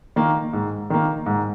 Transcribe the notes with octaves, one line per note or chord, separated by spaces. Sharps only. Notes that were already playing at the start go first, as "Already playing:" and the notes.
D#3 A#3
G#2
D#3 A#3
G#2